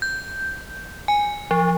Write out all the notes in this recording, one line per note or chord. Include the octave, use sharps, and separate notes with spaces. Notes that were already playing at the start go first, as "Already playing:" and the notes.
G6
G#5
F3